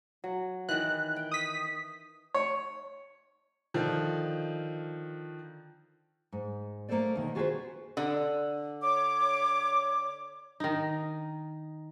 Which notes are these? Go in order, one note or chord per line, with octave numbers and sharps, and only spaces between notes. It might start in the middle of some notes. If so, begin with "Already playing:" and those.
F#3
D#3 E3 F#6
G5
D#6 B6
C#5
D3 D#3 F3
G#2
A3 A#3 E4 A4 C5 D5
B2 D#3
F4 F#4 G#4 A4 B4 C5
D3
C#5 D6
D#3 D#4